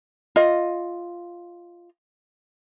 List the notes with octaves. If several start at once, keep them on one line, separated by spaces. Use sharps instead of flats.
F4 D#5